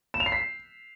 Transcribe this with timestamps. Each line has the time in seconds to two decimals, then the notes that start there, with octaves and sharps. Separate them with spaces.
0.14 E7
0.20 F7
0.26 C7
0.32 B6